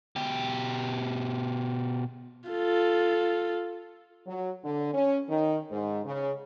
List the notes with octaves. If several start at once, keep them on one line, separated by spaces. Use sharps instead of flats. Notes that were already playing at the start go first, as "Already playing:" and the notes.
B2 G4
F4 A4
F#3
D3
C#4
D#3
G#2
C#3